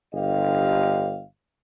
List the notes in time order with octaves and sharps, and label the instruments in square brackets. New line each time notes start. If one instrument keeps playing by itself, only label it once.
[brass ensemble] G1 D3 G4 D#5 F5